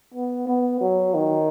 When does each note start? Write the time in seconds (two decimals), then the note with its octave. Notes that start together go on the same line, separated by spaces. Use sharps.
0.14 B3
0.47 B3
0.81 F#3
1.14 D#3